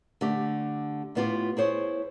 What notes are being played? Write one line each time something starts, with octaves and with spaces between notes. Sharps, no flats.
D3 A3 G4
A2 G3 B3 E4 F4 G4
E4 G#4 C5 C#5